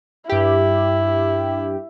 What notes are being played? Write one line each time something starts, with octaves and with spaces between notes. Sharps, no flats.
G2 E4 G4